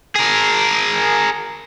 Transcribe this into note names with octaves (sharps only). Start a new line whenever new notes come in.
G#4 A#4